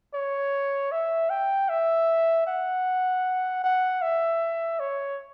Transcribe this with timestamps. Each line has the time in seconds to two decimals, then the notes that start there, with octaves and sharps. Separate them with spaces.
0.14 C#5
0.91 E5
1.30 G5
1.69 E5
2.47 F#5
3.64 F#5
4.02 E5
4.80 C#5